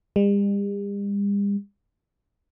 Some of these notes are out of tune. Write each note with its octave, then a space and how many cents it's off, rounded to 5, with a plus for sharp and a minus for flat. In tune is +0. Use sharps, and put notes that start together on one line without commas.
G3 +45